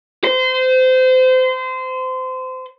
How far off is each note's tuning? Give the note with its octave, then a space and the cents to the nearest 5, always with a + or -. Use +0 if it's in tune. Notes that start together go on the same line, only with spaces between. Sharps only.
C5 -25